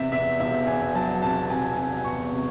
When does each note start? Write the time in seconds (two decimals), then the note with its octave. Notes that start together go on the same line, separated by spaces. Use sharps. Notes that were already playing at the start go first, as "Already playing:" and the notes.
Already playing: E2 C3 E5
0.12 E2 E5
0.40 E1 E5
0.67 E2 G#5
0.95 F#3 A5
1.22 C3 A5
1.50 C3 G#5
1.77 C3 G#5
2.05 E2 C#6
2.32 C3